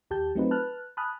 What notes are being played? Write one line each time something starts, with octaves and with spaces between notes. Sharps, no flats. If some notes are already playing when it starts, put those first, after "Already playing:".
D#2 G4 A5 G6
F#3 A3 C4 D#4 F4 B4
B4 A5 F6 F#6
G#5 A5 B5 D#6 F6 F#6